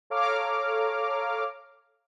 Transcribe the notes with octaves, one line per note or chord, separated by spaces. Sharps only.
A4 C#5 F5 A#5 D6 F6